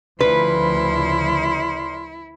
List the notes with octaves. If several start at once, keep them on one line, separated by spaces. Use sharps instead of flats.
D2 C#3 F3 E4 A#4 B4 D5 C6